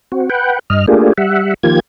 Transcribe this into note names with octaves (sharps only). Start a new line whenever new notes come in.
C4 F#4
B4 F#5 G5
G2 D#5 F6
A3 A#3 D4 F4 G4 G#4
G3 E5 F#5
D#3 F3 A#3 F4 G4 G#6